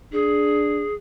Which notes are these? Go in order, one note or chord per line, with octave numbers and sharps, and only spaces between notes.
D4 G#4